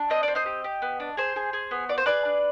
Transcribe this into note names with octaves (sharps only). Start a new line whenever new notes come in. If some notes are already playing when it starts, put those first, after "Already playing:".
Already playing: D4
C4 D#5
C4 D5
C5 D#5
G4
G4
B3
D4
G#4 C5
G#4
G#4
B3
F4 D5
C5
G#4 B4 D5
D4